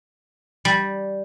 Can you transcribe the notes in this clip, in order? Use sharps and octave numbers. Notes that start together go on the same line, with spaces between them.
G3